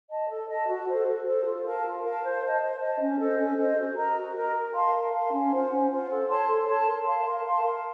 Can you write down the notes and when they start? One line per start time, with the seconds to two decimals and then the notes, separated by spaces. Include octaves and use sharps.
0.10 D#5 A5
0.29 A4
0.48 D#5 A5
0.68 F#4
0.87 A4 C5
1.07 F#4
1.26 A4 C5
1.45 F4
1.64 A#4 F5 A5
1.84 F4
2.03 A#4 F5 A5
2.22 C5
2.41 D#5 A5
2.61 C5
2.80 D#5 A5
3.00 C#4
3.19 A4 C5 D#5
3.38 C#4
3.57 A4 C5 D#5
3.77 F#4
3.96 A#4 D#5 A#5
4.16 F#4
4.35 A#4 D#5 A#5
4.54 A#4
4.74 F5 A5 C6
4.93 A#4
5.13 F5 A5 C6
5.31 C#4
5.51 F4 C5 F#5
5.70 C#4
5.89 F4 C5 F#5
6.09 A4
6.28 C#5 A5 C6
6.47 A4
6.67 C#5 A5 C6
6.86 A#4
7.05 F5 A5 C6
7.25 A#4
7.44 F5 A5 C6
7.64 A#4